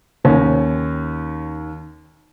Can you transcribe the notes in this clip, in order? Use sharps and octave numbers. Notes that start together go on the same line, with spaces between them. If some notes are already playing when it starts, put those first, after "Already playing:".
D#2 D#3 C#4